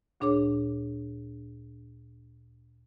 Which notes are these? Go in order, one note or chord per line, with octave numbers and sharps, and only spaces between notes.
D2 A#2 D4 G#4 C#5 D6